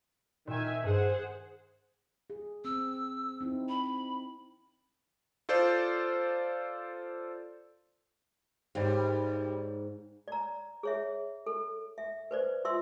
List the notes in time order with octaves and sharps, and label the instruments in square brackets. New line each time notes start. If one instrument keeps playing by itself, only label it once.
[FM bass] A#2 [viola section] D#3 E5 G#5
[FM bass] G2 [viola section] G#4 C5 F#5
[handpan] G#4
[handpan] C4 [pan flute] E6
[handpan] C4 D#4 E4
[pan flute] B5
[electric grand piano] F4 A4 C5 D5
[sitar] D#2 G3 [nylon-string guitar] G#2
[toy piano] D5 A#5
G#4 C#5 E5
A4
E5
B4 C5 D5
F4 E5 C6 E6